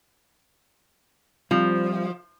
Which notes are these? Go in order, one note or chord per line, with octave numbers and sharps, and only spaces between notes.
F3 G3 C4 F4